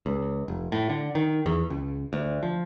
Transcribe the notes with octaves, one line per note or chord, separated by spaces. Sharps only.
C#2
F1
A2
D3
D#3
E2
C#2
D2
F3